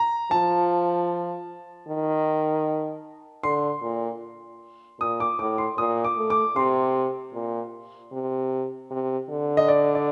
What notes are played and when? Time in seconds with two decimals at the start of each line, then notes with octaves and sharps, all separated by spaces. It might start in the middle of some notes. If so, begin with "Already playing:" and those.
Already playing: A#5
0.31 F3 A5
1.88 D#3
3.43 D3 C6
3.82 A#2
5.01 A#2 D#6
5.20 D6
5.39 A2 D6
5.58 C6
5.78 A#2 D#6
6.04 D6
6.18 A3
6.30 D6
6.56 C3 C6
7.34 A#2
8.12 C3
8.91 C3
9.30 D3
9.57 D#5
9.68 D5
9.95 D5